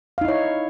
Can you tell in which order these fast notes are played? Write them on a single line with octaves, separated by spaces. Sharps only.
F5 D#4 E4 C#5